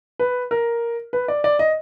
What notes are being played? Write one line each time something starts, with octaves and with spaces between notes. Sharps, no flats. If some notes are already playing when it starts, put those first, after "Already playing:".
B4
A#4
B4
D5
D5
D#5